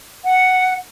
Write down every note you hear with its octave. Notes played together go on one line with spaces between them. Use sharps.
F#5